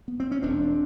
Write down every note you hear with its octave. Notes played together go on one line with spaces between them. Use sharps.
B3
C4
C#4
E1 C4 D4